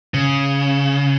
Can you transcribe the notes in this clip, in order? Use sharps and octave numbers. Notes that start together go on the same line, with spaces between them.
C#3